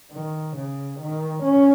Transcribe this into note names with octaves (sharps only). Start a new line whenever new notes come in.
D#3
C#3
D#3
C#4